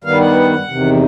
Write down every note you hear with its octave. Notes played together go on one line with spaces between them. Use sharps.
G2 D#3 G3 B3 F5
F#5
E2 C3 D#3